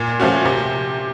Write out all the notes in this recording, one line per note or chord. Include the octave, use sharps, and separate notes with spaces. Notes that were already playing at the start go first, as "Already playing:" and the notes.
Already playing: A#2
F3 A3 C#4 F#4
C3